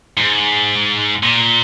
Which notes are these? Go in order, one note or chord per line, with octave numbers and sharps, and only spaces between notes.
G#2
A#2